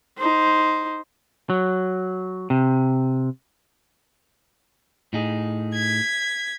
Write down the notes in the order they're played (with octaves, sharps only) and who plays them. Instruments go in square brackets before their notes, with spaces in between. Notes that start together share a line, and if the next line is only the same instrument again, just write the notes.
[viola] D#4 C5
[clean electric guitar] F#3
C3
A2 D#4 G#4
[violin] G#6 B6